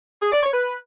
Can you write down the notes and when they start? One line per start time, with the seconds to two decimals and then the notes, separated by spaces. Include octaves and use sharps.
0.21 G#4
0.31 D5
0.42 C#5
0.52 B4